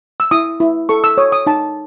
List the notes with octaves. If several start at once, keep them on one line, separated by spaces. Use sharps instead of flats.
E6
E4 D#6
E4
A4 C#6
E6
C#5 D#6
D#6
D#4 A5